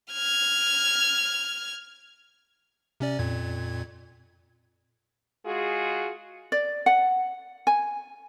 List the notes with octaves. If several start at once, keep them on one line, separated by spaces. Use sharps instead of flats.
F6 G#6
C3 C#4 D5
F2 A#2 G#6
G#3 F4 F#4 G#4
D5
F#5
G#5